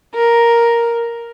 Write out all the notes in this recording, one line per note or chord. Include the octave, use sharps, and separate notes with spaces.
A#4